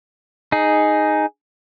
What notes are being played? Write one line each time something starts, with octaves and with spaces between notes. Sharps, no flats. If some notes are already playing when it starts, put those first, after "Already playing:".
D#4 G#4